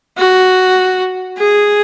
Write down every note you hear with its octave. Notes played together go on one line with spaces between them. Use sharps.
F#4
G#4